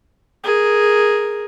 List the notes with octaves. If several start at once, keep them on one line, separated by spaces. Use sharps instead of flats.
G#4 A#4